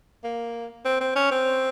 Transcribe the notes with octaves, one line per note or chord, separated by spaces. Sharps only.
A#3
C4
C4
C#4
C4